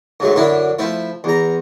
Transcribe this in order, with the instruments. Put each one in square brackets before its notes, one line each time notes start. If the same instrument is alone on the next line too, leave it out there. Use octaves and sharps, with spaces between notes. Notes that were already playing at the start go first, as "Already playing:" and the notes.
[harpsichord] G#2 F#3 A3
F#2 D3 F#3 D4 E4
F3 A3 E4
E2 A#5